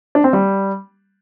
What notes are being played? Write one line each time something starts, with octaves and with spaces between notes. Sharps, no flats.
D4
C4
G3